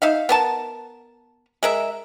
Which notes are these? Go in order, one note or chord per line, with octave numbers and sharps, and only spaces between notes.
D#4 E5 F5
B3 A#4 A5
G#3 A#4 E5